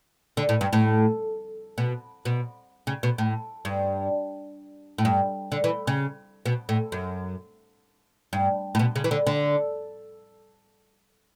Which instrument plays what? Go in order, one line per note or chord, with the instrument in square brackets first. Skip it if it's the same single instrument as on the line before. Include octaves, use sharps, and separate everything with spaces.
[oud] D3
A2
G2
A2
B2
B2
C#3
B2
A2
G2
A2
G2
D3
E3
C#3
B2
A2
F#2
G2
A2
B2
C#3
E3
D3
D3